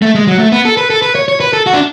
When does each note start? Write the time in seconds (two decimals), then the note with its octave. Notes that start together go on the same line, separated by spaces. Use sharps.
0.02 A3
0.15 G#3
0.27 F#3
0.39 A3
0.52 B3
0.65 A4
0.77 B4
0.90 A4
1.02 B4
1.15 C#5
1.28 C#5
1.40 B4
1.53 A4
1.66 F#4
1.73 D4